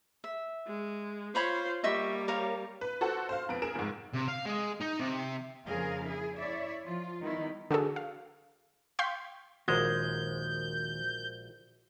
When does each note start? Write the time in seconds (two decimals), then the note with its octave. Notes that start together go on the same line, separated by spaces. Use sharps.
0.24 E5
0.67 G#3
1.35 F4 C5 C#5 B5 C#6
1.84 G3 A#3 D#5 E5 C#6
2.28 A#4 C#5 F5
2.81 B4
3.01 F#4 A4 C5 F#5
3.29 C5 F5
3.49 F2 B3 D7
3.62 G#4 A#4 D7 E7
3.75 F1 G#2
4.13 C3
4.28 F5
4.46 G#3
4.81 D#4
5.00 C3
5.66 F2 C#3 A#3 G#4 A#4 F5
6.03 E4 G#4
6.37 E4 C#5 D5 E5
6.83 F3 F4
7.21 D#3 G3 B3 D#4 E4
7.71 D3 F#4 G#4 A4
7.96 F5
8.99 F5 G5 C6 C#6 G6 B6
9.68 A#1 D#2 G#3 F#4 A#4 C5 G6